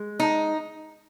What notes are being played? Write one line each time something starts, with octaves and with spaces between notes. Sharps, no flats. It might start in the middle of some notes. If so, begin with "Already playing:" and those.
Already playing: G#3
D#4